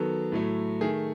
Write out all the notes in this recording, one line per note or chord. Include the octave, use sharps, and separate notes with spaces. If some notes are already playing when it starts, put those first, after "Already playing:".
Already playing: D#3 F#3 B3 A4
A2 F#3 A3
D#3 A3 G#4